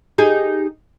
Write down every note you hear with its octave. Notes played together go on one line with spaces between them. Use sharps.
D#4 G4 G#4